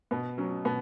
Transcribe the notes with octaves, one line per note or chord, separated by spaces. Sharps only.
B2 B3
F#3 C#4
B2 B3